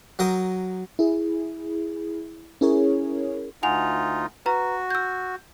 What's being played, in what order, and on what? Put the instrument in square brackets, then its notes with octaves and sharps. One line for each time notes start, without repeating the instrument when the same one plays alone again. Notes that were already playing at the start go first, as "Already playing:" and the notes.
[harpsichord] F#3 A#4 G5 D#6
[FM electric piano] E4 G#4
C#4 E4 G#4 A#4 C#5
[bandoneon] D2 D#4 F4 [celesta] F#5 G#5 F7
[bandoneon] F#4 [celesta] B4 A#5
[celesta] E6 G6